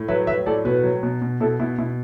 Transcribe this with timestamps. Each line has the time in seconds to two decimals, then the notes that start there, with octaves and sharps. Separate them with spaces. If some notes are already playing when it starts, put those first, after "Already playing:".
Already playing: A2
0.08 F#3 B4 E5
0.27 F#3 B4 E5
0.46 A2 A4 D5
0.65 B2 F#4 B4
0.83 F#3
1.03 B2
1.22 B2
1.40 B2 E4 A4
1.59 B2 E4
1.78 B2 E4